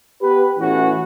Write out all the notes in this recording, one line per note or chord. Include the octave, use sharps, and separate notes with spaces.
B3 G4 B4
A2 E3 C#4 F#4